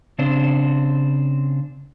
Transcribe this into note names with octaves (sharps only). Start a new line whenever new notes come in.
C#3 C4 D4 C5